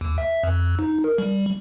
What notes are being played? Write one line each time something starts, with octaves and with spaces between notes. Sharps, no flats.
D#2
E5
F2
D#4
A#4
G3